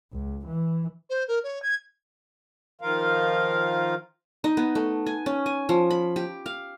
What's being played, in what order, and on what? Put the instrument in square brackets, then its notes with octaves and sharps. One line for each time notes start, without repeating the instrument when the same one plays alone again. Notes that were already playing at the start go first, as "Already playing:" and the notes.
[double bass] C#2
E3
[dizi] C5
A#4
C#5
G#6
[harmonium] D#3 F3 F4 A#4 F5
[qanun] D#4
B3
A3
G#5
C#4
G#5
F3
B5
G4
F5